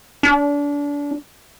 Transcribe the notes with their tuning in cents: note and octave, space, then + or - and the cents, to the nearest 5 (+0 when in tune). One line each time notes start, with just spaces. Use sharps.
D4 -30